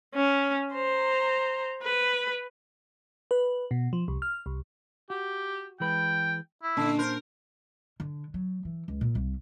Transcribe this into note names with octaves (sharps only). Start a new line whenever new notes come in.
C#4
C5 A#5
B4
B4
B2
F3
C2
F6
C2
F#4 G4
E3 G#3 B4 G5
E4
A#2 D3 C#4 A5
A#4 C5
D3
F#3
E3
C#2
A#2
C2